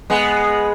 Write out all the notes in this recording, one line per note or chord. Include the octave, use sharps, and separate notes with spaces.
G#3 B3